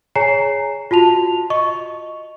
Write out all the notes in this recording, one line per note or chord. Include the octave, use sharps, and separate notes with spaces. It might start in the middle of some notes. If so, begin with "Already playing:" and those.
G#4 C#5 G#5 A#5 C7
F4 F#4 A5 F7
D#5 C#6